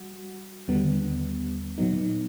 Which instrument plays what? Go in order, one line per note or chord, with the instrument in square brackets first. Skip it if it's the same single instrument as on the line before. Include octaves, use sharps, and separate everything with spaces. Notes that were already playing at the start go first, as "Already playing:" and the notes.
Already playing: [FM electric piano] G3 F#4
D#2 D3 G3 B3
A#2 F#3 B3 D#4